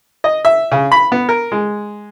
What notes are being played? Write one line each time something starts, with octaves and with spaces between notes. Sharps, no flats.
D#5
E5
C#3
B5
B3
A#4
G#3